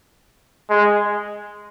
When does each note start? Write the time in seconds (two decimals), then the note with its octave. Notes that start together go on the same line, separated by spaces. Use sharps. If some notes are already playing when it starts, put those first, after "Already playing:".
0.70 G#3